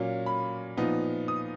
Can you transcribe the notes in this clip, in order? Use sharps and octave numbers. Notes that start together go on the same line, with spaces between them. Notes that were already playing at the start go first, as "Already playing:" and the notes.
Already playing: A#2 F#3 A#3 C#4
B5
A#2 F3 B3 D#4
D#6